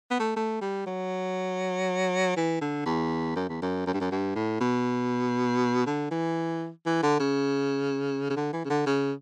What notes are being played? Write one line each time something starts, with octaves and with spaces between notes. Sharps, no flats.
B3
A3
A3
G3
F#3
E3
D3
E2
F#2
E2
F#2
F#2
G2
F#2
G2
A2
B2
D3
E3
E3
D3
C#3
C#3
D3
E3
C#3
D3
C#3